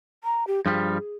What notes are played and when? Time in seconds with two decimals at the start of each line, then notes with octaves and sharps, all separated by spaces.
0.24 A#5
0.47 G4
0.66 G2 F3 G3 G#4